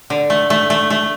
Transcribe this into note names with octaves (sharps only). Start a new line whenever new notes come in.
D3
A3
A3
A3
A3